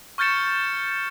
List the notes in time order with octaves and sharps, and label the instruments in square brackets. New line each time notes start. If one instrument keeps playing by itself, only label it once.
[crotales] C#6 F6 G6 A6 C#7 E7